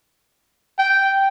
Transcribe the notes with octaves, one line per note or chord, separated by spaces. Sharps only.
G5